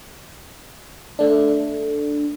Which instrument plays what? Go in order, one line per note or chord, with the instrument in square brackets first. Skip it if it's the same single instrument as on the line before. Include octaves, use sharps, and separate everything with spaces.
[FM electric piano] A3 D4